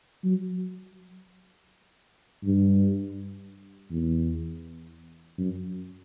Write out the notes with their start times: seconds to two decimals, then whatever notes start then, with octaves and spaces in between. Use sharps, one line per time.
0.24 F#3
2.44 G2
3.91 E2
5.38 F#2